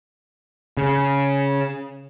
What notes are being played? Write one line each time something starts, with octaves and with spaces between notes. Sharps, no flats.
C#3